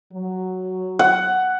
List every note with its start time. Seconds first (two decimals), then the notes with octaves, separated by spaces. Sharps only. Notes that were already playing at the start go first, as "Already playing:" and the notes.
0.13 F#3
0.99 F#5